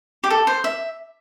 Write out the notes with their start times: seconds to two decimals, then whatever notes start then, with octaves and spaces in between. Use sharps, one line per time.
0.24 G4
0.30 A4
0.47 C5
0.64 E5